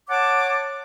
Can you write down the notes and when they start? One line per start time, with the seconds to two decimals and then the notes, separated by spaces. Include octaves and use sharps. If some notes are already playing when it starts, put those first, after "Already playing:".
0.10 C#5 F#5 A5 D6